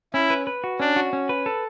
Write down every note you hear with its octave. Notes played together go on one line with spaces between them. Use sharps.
C#4 E4
B4
B4
F#4
C#4 D4
F#4
C#4
B4
A4